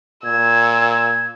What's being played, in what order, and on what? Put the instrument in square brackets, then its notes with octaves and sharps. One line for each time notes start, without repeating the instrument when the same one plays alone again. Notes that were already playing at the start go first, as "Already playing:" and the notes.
[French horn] A#2 [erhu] E6 [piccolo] G#6
[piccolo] G#6